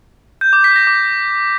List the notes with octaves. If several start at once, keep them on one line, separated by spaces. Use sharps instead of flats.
G6
D6
B6
A#6
D6